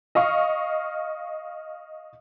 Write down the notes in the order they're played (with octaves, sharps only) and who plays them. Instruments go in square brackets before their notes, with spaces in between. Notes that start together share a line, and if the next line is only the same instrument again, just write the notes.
[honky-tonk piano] D#5 F5 C#6